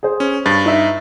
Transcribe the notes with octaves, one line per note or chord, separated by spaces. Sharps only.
G#4 C5
C#4
G2 A6
D#4 E5